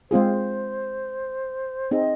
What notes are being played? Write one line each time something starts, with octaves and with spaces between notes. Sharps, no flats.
G#3 C4 F4 G#4 C5
C4 D#4 G#4 D#5